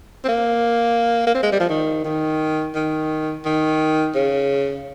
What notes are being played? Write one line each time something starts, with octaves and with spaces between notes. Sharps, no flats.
C4
A#3
A#3
C4
G#3
G3
F3
D#3
D#3
D#3
D#3
C#3